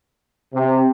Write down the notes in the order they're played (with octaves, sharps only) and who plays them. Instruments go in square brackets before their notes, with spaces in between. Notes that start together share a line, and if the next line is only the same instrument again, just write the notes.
[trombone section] C3